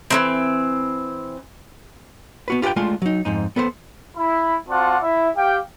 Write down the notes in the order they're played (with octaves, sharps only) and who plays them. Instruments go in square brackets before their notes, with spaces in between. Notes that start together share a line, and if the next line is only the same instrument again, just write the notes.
[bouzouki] E3 A#3 C4
[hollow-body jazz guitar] B3 F#4 B4
F4 G4 A#4 B4 G5
G#3 A3 D4 F4
F#3 D#4
F2 G#2 D#4
B3 A4 B4 C5
[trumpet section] E4 B5
C4 F4 F#4 D5 F#5 A5
E4 E5
G4 F5 G5